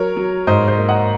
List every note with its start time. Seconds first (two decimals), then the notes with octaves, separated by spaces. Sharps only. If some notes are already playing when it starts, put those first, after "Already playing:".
Already playing: F#3 A#4 C#5
0.17 F#3
0.47 G#2 C5 D#5
0.68 C5 D#5
0.79 A#3
0.89 D#5 F#5